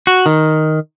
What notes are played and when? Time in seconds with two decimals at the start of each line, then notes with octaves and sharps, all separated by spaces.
0.07 F#4
0.26 D#3